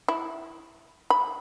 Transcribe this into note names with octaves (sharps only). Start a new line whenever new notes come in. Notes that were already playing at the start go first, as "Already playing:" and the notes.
E4
B5